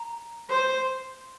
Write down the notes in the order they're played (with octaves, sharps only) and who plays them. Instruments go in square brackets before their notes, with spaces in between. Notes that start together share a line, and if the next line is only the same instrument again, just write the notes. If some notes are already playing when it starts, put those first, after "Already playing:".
Already playing: [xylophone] A#5
[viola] C5